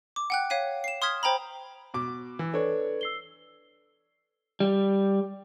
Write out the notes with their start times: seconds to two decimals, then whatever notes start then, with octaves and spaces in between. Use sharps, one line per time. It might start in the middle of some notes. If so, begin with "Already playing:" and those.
0.16 D6
0.30 F#5 G5 F#6
0.50 C#5 F5 B6 D#7
0.84 C7 E7
1.02 C6 D#6 F6 G#6 B6
1.23 C5 G5 A#5 B5
1.94 B2 D6
2.39 E3
2.54 D4 A4 B4 C#5
3.01 E6 C7 G7
4.60 G3